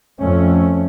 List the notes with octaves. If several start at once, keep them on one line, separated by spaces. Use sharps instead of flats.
F2 A3 C#4